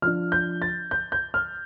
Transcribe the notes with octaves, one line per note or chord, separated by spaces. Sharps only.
F3 D4 F6
G6
A6
G6
G6
F6